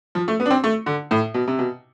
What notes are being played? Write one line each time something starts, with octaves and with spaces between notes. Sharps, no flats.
F3
A3
B3
D4
C4
A3
D3
A2
B2
C3
B2